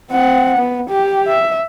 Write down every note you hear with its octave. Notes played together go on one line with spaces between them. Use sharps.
C4 F#5
B3
G4
E5